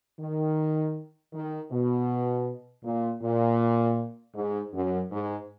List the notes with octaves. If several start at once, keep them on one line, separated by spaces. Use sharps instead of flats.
D#3
D#3
B2
A#2
A#2
G#2
F#2
G#2